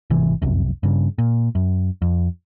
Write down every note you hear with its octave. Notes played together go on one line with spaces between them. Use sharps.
G#1 C3 E3
F1 C2 F#2
G2 C#3
A#2
F#2
F2